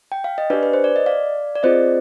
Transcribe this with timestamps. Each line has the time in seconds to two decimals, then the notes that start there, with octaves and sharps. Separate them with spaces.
0.12 G5
0.24 F5
0.38 D#5
0.50 D4 G4 B4 D5
0.63 B4
0.73 C5
0.84 D5
0.96 D#5
1.06 D5 F5
1.55 D5
1.63 C4 F4 G#4 C5 D#5